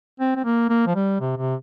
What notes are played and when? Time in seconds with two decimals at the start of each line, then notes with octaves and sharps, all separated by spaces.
0.20 C4
0.36 C4
0.44 A#3
0.69 A#3
0.87 F3
0.95 G3
1.21 C3
1.37 C3